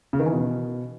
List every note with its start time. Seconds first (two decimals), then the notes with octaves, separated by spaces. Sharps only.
0.13 C#3
0.20 D#3
0.26 E3
0.32 B2